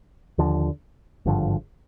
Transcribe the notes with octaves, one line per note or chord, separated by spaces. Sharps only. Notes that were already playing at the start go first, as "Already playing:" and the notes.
D#2 D3 F3
G#1 G2 D3 F3